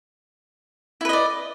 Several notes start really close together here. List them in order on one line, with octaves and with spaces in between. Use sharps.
E4 B4 D#5 D5